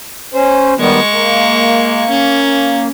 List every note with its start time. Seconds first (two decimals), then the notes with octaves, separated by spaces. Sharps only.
0.34 C#4 C5
0.78 D#3 G3 G#3 B3 C#6
1.11 A#3
2.09 C#4